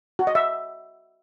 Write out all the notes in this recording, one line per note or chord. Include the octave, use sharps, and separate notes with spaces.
F#4
D#5
E5